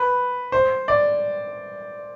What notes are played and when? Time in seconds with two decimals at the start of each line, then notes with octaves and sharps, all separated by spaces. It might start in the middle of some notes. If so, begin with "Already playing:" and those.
Already playing: B4
0.52 C5
0.88 D5